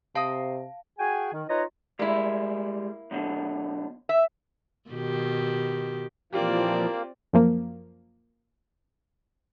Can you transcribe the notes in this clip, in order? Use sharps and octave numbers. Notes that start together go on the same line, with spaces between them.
C3 C5 F5 A5 D#6
F#4 G#4 G5 G#5
D#3
D#4 F4 B4 C#5 D#5 A#5
G3 G#3 A#3 E4
F#2 B2 D3
E5
B2 D#3 G4
A#2 E3 F3 A#3 C4 F4 G4 D5
F#2 F3 A#3